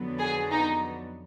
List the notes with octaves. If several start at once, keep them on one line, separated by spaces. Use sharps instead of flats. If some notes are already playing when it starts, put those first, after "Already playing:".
Already playing: F2 D3 F#3 B3
G#4
D#4